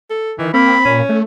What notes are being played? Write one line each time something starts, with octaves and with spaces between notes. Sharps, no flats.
A4
D#3 E3
A#3 C4 B5
A#2 C#4
A3